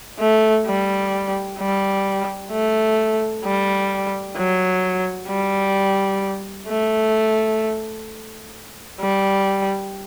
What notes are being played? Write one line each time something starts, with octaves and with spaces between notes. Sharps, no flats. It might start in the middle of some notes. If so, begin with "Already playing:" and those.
A3
G3
G3
A3
G3
F#3
G3
A3
G3